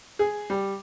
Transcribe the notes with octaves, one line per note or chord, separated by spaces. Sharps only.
G#4
G3